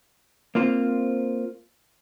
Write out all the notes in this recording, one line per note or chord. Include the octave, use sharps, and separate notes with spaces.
A#3 C4 F4 C5